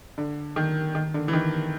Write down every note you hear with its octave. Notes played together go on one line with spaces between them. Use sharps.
D3
D#3
D#3
D3
E3
D#3